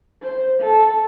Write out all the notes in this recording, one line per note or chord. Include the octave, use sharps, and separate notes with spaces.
C5
A4